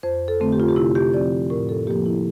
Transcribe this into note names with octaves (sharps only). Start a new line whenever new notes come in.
F2 C5
A4
D3 A3 C4
G4
F4
G4
C3 E4
G4
F3 C4 D5
A2 A#4
A4
F3 A#3 G4
E4